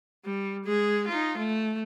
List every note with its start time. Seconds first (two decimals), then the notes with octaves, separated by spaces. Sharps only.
0.25 G3
0.65 G#3 G#4
1.08 D#4 F4
1.38 A3